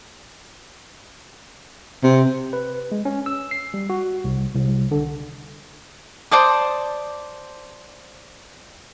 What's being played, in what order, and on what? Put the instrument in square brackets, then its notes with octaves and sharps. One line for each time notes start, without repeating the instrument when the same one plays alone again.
[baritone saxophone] C3
[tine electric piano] B4
G#3
C#4
E6
C7
G3
F#4
C2
C2
D3
[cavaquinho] C5 D5 A5 D#6